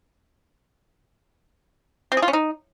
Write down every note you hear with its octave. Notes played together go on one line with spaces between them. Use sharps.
C4
G#4
F4
C#4
D#4